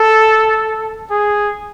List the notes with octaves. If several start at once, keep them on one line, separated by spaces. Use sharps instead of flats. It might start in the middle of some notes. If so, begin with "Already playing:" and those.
Already playing: A4
G#4